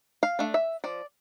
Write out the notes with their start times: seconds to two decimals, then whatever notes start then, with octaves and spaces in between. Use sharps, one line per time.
0.23 F5
0.39 A3 D4
0.54 E5
0.84 F3 D5